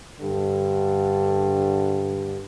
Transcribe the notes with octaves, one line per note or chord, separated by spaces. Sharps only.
G2 D3